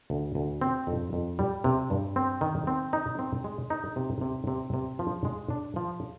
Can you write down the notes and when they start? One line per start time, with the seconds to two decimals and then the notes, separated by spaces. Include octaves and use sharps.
0.10 D2
0.35 D2
0.61 C4
0.87 F2
1.13 F2
1.39 G3
1.64 C3
1.90 G2
2.16 C4
2.41 D#3
2.67 C4
2.93 D#4
3.19 C4
3.44 G#3
3.70 D#4
3.96 C3
4.21 C3
4.47 C3
4.74 C3
4.99 F3
5.25 G#3
5.50 D4
5.76 F3